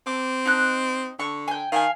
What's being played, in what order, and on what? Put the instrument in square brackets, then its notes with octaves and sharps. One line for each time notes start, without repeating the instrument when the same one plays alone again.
[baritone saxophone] C4 [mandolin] D6
[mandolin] D#4 F#6
[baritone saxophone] D3 [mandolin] C#6
[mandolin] G5 G#5
[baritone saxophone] D#3 [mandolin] F5 G5 G#5